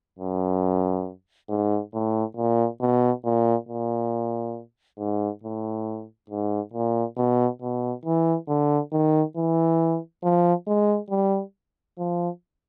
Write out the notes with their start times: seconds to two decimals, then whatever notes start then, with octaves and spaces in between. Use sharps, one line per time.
0.19 F#2
1.49 G#2
1.94 A2
2.37 A#2
2.81 B2
3.25 A#2
3.69 A#2
4.99 G#2
5.43 A2
6.30 G#2
6.73 A#2
7.17 B2
7.62 B2
8.05 E3
8.48 D3
8.92 D#3
9.37 E3
10.23 F3
10.68 G#3
11.10 G3
11.98 F3